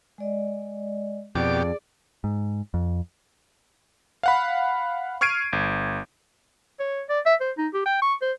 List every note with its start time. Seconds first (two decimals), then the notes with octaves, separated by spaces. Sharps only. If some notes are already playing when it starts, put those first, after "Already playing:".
0.18 G#3 D5 D#5
1.35 F2 B2 G4 G#4 D5 D6
2.24 G#2
2.74 F2
4.23 F5 F#5 B5
5.21 C#6 F6 G#6 C7 D7 D#7
5.53 G1
6.80 C#5
7.10 D5
7.26 E5
7.41 C5
7.58 D#4
7.74 G4
7.86 G5
8.02 C#6
8.22 C5